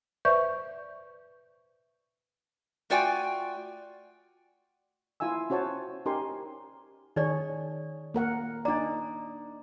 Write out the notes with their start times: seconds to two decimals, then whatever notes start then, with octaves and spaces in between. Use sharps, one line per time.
0.25 B4 C5 D5 E5 C#6 G6
2.90 A3 F4 F#4 D5 G5 G#5
5.20 E4 F4 E5 G#5 E6
5.50 C#4 F#4 C5 C#5 A5
6.05 C#4 D#4 G4 A#4 G#5 C6
7.16 D#3 D#4 G#4 C#5 D5
8.14 A#3 A#4 F#5
8.65 D4 D#4 D5 A#5